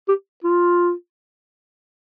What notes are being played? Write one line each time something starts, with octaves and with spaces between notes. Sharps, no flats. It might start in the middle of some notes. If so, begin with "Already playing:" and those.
G4
F4